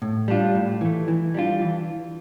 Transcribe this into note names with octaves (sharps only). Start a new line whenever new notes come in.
A2
G3 D4 F4
A2
E3 A3
E3
G3 D4 F4
E3